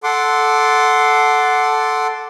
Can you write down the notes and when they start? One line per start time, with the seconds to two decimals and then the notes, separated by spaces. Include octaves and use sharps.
0.03 A4 F#5 C6 D6